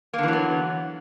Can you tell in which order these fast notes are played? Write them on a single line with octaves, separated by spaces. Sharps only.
A#3 D3 E3 F#3 B3